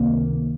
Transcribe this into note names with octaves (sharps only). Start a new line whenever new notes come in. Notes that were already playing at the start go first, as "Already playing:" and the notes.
Already playing: C#2 C3 D#3 A#3